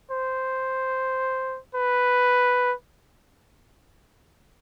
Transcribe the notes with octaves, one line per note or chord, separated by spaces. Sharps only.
C5
B4